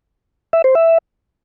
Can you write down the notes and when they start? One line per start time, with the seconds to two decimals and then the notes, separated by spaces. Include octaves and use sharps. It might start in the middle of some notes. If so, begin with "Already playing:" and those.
0.53 E5
0.64 C5
0.75 E5